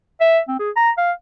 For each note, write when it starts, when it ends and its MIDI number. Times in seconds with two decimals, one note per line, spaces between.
0.21 0.39 76
0.48 0.56 60
0.59 0.70 68
0.76 0.91 82
0.97 1.11 77